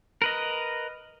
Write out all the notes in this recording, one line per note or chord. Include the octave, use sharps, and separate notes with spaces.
A#4 B4 D#5